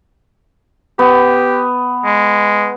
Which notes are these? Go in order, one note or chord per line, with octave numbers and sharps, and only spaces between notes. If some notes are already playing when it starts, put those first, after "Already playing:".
B3 G4
G#3